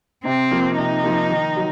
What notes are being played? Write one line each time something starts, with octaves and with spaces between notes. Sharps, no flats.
C3 C4
F3 A#3
C3 D#4
F3 A#3
D#3
F#3